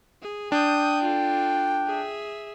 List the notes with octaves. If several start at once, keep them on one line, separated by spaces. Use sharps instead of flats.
G#4
D4 G5 D#6 G6
F4 A4
G#4 E5